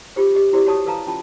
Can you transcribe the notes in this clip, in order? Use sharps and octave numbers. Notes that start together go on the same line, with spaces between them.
F4 G4 C5
G4 D#5
E4 F#4 G4 C5 D5
F#4 C#5 A5 C#6 D#6
A4 B4 F5 A5 A#5
C#4 F4 A5